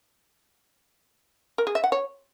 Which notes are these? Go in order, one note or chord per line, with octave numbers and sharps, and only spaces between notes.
A#4
G#4
E5
F#5
C#5